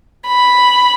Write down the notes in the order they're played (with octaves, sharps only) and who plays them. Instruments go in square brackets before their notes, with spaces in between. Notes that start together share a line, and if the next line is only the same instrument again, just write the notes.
[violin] B5